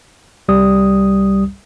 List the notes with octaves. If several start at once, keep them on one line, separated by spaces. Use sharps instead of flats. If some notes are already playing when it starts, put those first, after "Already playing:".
C2 G3 D#6